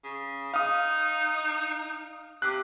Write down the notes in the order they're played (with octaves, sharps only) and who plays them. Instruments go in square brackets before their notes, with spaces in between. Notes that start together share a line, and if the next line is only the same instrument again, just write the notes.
[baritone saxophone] C#3
[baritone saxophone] D#4 [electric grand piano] F5 D#6
[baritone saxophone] C3 [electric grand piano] D6 F#6